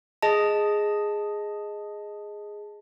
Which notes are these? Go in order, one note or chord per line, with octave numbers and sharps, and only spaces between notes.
G#4 D#5 A5